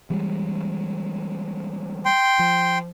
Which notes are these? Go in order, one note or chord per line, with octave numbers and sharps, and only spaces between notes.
E3 G3 G#3
G5 C6
F3